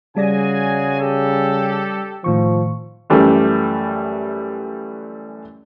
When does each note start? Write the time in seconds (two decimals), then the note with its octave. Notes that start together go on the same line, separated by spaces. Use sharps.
0.17 C#3 G3 F#4 G#4 D5 G#5 A#6
1.00 G4 A4
2.24 A2 D#3 F3 C#6
3.10 F#2 E3 G3 A3